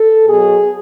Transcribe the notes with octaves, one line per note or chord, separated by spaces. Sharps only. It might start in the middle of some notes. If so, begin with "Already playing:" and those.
Already playing: A4
B2 F#3 G#4